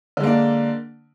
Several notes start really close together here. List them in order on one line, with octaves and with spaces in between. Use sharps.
D3 G#3 A#3 D4